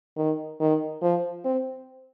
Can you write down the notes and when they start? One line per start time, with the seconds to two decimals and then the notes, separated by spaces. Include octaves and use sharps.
0.17 D#3
0.60 D#3
1.02 F3
1.44 C4